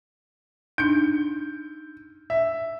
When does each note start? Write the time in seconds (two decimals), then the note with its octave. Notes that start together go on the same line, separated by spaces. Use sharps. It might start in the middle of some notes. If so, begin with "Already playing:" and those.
0.78 D4 D#4 G6
2.30 E5